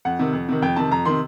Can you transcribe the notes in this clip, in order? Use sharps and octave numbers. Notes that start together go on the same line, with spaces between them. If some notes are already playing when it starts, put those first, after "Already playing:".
F2 F#5
C3 D#3
F2
C3 D#3
F2 G5
C3 D#3 A5
F2 A#5
C3 D#3 C6